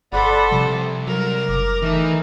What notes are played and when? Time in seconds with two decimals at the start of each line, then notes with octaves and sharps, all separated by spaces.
0.13 G1 A4 C5 D5 F#5 B5
0.52 C2 C3 F3
1.07 F#3 A#4
1.49 F#1 D6
1.82 E3 A3 D#4